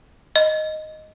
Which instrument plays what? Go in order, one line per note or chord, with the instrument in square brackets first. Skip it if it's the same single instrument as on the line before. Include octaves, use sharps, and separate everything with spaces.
[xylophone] D#5